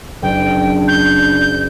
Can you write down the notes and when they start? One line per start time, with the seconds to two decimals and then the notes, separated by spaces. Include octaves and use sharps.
0.22 F#1 D4 G5
0.88 G6